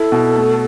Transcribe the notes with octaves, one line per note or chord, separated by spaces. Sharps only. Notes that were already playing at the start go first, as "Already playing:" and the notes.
Already playing: E4 A4
B2
A3